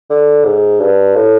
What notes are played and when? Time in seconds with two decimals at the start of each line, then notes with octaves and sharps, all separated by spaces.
0.10 D3
0.45 G#2
0.80 G2
1.16 A2